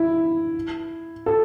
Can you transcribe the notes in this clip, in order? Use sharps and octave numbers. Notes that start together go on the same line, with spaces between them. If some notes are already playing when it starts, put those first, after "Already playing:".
Already playing: E4
A4